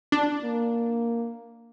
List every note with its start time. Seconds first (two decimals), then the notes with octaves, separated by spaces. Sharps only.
0.12 D4
0.43 A#3